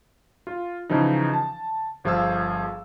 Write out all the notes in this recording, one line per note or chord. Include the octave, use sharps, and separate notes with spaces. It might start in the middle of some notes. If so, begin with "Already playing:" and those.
F4
C#3 E3 F3 D#4
A5
G1 F3 G#4 F5 E6